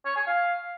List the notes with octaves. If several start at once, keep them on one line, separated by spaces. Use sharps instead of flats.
C#5
G#5
F5